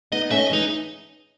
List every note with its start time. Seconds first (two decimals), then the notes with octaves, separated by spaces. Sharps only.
0.12 B3 D#4 D#5
0.31 A3 C#4 E5
0.38 D#5
0.50 E3 G#3 D#4